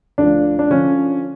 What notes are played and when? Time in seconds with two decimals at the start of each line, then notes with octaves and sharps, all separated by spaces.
0.18 D2 D3 F3 D4
0.59 D4
0.70 D3 F3 C#4